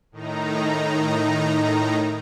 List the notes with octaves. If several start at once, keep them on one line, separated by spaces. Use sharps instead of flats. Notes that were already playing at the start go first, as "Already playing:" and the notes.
A2 D#3 D#4 A#5